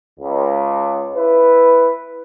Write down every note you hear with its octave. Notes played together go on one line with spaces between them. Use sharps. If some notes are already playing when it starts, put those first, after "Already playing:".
C#2
E4 B4